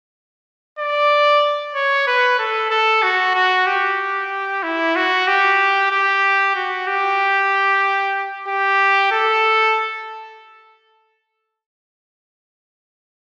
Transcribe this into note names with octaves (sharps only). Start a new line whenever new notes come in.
D5
C#5
B4
A4
A4
F#4
F#4
G4
E4
F#4
G4
G4
F#4
G4
G4
A4